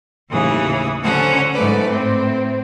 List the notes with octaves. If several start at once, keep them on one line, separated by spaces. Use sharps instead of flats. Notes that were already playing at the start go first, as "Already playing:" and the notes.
D#2 A2 C#3 E3 G#4 D#6
D3 C#4 C5 F#5 A5 A#5
G#2 A3 B4 D5
A2 C4